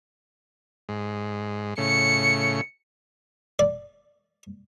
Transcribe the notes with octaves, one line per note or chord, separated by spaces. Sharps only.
G#2
A2 C#3 C#7
D5